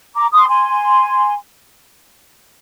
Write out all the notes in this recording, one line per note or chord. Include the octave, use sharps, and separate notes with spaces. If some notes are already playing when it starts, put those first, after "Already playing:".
A#5 D6
C6 D#6
G#5 C6